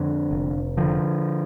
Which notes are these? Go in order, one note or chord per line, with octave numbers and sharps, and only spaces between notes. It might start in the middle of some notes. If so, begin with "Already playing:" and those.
Already playing: F2 D3
F1
D3 F3